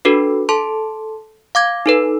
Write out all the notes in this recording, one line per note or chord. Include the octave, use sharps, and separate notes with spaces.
D4 F#4 A4 B4
A4 A5 C6
F5 D6 G#6
D#4 A4 B4